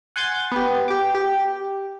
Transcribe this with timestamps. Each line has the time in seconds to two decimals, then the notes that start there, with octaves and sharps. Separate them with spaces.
0.16 F#5 G#5 C6 G6 A6
0.52 B3 G4
0.88 G4 D6
1.15 G4